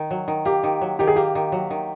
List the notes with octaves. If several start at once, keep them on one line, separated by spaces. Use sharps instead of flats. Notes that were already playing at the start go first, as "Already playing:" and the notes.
Already playing: D#3
F#3
D#3
A#3 G4
D#3
F#3
D#3 G4
G#4
A#3 G4
D#3
F#3
D#3